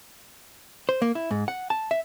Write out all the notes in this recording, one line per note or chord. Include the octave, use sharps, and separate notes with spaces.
C5
A#3
E4
G#2
F#5
A5
E5